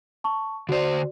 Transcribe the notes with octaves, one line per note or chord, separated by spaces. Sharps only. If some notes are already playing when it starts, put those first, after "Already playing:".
A5 C#6
D3 F#4 C5 D5